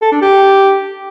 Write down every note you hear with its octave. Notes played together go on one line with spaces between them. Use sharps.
A4
D4
G4